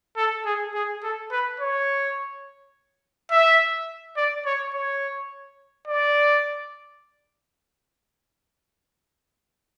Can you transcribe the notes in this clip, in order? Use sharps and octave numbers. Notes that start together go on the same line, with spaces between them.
A4
G#4
G#4
A4
B4
C#5
E5
D5
C#5
C#5
D5